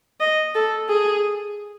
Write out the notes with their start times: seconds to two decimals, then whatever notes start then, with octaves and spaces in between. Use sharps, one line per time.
0.20 D#5
0.55 A4
0.89 G#4